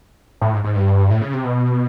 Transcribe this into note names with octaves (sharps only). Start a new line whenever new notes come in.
A2
G#2
G#2
G2
A2
C#3
C3
B2